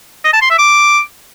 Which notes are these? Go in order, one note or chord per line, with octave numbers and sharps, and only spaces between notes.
D#5
A5
C6
E5
D6